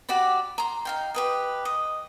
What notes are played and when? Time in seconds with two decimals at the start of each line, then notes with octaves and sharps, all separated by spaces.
0.09 F#4 G4 D5 B5
0.58 A#5 C6
0.85 D#4 F5 G5
1.14 G4 B4 D#5
1.65 D#5